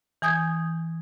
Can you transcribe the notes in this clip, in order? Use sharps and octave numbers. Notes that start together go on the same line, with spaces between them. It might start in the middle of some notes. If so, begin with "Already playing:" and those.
E3 G#5 D#6 G6 G#6